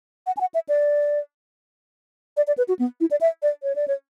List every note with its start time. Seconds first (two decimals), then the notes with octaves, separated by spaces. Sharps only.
0.27 F#5
0.37 G#5
0.41 F#5
0.54 E5
0.69 D5
2.37 D5
2.47 D5
2.58 B4
2.68 F#4
2.79 B3
3.01 E4
3.11 D5
3.21 E5
3.42 D5
3.63 C#5
3.76 D5
3.88 C#5